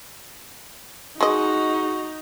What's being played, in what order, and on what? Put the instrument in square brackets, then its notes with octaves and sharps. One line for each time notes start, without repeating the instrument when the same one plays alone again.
[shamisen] G#3 D#5 [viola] D#4 [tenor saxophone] F#4 [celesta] G#4